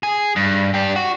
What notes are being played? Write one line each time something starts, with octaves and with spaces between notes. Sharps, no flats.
G#4
G2
D4 G4
F#4